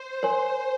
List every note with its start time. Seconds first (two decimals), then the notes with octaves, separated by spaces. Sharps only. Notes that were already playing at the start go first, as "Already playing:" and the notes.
Already playing: C5
0.23 A#4 C#5 G#5 C6